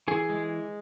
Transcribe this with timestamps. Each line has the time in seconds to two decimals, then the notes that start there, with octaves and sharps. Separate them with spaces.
0.08 E3 G#4
0.30 G#3